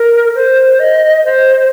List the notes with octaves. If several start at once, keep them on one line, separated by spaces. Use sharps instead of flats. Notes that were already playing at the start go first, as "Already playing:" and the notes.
Already playing: A#4
C5
D#5
C5